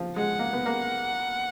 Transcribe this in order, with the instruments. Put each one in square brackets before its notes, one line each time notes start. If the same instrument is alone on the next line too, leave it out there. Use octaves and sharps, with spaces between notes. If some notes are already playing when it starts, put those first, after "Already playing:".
Already playing: [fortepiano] F3
[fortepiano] G#3 [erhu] F#5
[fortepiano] A#3
B3
A#3